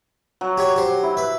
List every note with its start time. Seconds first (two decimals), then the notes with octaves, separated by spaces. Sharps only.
0.41 F#3
0.58 G4 C#5
0.76 G4 C5
1.03 E4
1.17 B4